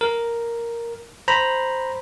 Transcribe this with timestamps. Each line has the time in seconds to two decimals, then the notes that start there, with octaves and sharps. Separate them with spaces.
0.01 A#4
1.28 C5 A#5 B5